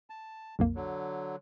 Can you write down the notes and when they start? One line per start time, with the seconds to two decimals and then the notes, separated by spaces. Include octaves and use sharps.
0.10 A5
0.59 B1 F2 A#3
0.75 D3 F#3